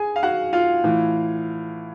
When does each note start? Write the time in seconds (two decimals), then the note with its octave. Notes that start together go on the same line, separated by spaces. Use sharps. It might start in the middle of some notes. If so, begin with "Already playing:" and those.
Already playing: G#4 G#5
0.16 F5
0.23 F#4 F#5
0.53 F4 F5
0.84 A2 E3